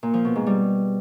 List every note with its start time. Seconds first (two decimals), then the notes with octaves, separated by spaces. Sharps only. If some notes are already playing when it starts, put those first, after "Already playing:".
0.03 A#2
0.14 F3
0.25 B2
0.36 G#2
0.47 G3